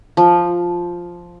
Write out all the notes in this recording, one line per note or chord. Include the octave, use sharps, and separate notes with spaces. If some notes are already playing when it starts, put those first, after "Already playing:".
F3